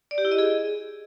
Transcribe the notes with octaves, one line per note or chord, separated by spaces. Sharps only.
D5
G4
E4
D#5
G#4